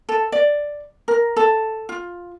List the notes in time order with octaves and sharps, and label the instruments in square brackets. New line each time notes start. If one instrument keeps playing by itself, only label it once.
[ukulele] A4
D5
A#4
A4
F4